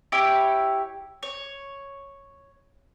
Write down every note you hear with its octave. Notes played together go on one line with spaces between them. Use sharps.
E4 G4 C#5 B5
C#5